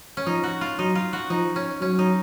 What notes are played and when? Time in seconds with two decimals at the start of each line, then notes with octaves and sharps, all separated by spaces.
0.17 C#4
0.26 F3 D#4
0.43 F#4
0.61 F4
0.79 F#3 D#4
0.95 F4
1.13 F#4
1.30 F3 D#4
1.56 C#4
1.81 F#3 C#4
1.99 D#4